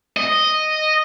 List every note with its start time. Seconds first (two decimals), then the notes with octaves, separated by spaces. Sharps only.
0.17 D#5